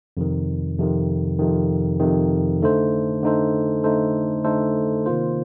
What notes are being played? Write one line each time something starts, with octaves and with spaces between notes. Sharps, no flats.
F2 C3 D#3
F2 C3 D#3
F2 C3 D#3
F2 C3 D#3
D3 A3 D#4 A4 C5
D3 A3 D#4 A4 C5
D3 A3 D#4 A4 C5
D3 A3 D#4 A4 C5
C3 D#3 A#3 F4 C5